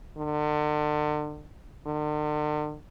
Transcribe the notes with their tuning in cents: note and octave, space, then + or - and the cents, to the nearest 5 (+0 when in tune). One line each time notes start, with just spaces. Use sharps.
D3 +35
D3 +45